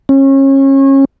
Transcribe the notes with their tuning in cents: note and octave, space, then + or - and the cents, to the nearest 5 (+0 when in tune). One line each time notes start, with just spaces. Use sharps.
C#4 -30